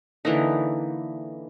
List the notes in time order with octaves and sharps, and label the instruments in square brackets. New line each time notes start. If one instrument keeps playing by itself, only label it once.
[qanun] D3 E3 A#3 D#4